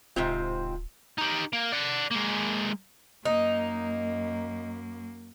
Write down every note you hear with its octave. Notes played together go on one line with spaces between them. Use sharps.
D1 G#2 C3 C4 F4
D#4 G4
A#3
D5 F#5
G#3 A#3
F#2 A#3 D#4